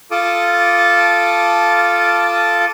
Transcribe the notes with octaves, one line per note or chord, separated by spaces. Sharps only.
F4 A4 A5 D6 D#6